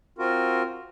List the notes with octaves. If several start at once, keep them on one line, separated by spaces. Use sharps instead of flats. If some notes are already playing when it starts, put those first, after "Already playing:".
C4 F4 F#4 A#4